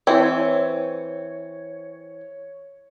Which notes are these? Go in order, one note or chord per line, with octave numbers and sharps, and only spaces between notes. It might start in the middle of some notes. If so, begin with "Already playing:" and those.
E3 C4 C#5